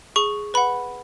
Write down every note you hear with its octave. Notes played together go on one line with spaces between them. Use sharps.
G#4 C#6
B4 F#5 B5